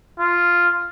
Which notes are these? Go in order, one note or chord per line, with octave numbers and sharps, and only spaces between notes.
F4